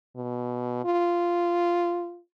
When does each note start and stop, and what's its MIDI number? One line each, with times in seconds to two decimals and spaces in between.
0.16 0.81 47
0.85 2.19 65